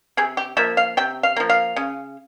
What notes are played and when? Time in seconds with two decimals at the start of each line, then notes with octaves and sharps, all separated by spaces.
0.17 C3 G#4
0.37 G4
0.57 F3 A#3 E5
0.77 F5
0.97 C3 G5
1.23 F5
1.36 F3 A#3
1.49 F5
1.76 C#3